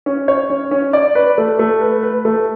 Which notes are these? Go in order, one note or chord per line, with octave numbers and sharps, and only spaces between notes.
C#4
C#5
C#4
C#4
D5
B4
A3
A3
B4
B4
A3